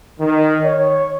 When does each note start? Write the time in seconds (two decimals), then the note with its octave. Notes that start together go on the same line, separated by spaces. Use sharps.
0.20 D#3
0.65 C#5